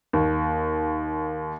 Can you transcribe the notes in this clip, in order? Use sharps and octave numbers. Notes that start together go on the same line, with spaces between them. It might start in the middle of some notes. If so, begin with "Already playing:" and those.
D#2